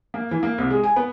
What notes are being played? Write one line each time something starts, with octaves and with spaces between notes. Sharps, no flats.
A#3
E3
A#3
C2
G#3
G#5
B3